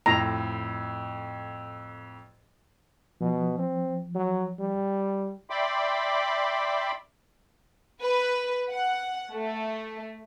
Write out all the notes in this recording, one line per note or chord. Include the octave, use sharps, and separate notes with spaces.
F2 A2 A#5
B2 F3
C4
F#3
G3
D5 E5 G5 B5 C6 D6
B4
F#5
A3